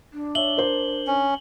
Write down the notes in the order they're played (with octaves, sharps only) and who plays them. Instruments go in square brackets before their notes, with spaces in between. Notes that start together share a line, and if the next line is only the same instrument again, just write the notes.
[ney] D4
[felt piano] C#5 E5 [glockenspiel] F#7 G7
[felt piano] A#4 C5
[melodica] C#4